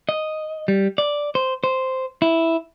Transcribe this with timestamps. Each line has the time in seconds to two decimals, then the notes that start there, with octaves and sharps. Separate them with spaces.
0.09 D#5
0.68 G3
0.98 D5
1.35 C5
1.64 C5
2.22 E4